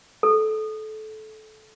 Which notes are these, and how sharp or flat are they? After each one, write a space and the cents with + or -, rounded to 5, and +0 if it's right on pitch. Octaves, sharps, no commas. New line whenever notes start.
A4 -20